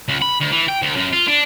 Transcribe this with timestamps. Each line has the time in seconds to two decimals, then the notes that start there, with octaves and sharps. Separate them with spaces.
0.09 C#2
0.22 B5
0.40 D2
0.51 E3
0.68 G5
0.82 D2
0.97 F#2
1.13 F4
1.28 D4